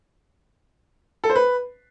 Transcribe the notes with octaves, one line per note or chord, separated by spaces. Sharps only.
A4
C5
B4